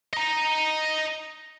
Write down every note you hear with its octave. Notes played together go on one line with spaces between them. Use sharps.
D#5 A#5